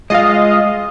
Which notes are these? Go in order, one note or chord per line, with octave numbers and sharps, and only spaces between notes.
G#3 F4 D#5 F5